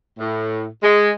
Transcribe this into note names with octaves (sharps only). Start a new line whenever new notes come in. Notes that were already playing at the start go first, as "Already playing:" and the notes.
A2
G#3